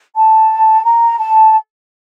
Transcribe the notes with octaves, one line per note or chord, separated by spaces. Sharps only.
A5
A#5
A5